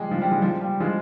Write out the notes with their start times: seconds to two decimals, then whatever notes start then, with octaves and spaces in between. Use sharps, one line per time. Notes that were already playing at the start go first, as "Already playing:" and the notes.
Already playing: F3 G3 G#3
0.11 F3
0.22 G3
0.31 F3 G#3
0.42 F3
0.61 G3
0.80 F3 G#3